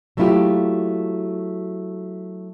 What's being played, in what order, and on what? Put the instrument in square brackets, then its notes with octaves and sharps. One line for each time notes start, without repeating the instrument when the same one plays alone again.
[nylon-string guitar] F#3 A3 A#3 E4 F4 G4